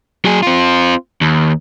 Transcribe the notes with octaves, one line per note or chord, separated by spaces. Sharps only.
F#3 G#4
C4 F4
D#2